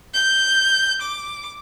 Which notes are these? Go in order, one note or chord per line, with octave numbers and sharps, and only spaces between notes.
G6
D6